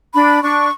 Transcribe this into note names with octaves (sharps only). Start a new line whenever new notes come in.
D4 B5
D4 C#6